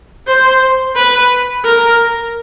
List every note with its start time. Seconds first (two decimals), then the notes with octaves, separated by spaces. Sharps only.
0.27 C5
0.96 B4
1.65 A#4